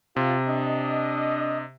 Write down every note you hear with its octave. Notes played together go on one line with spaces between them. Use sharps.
C3 F4
D4 D#5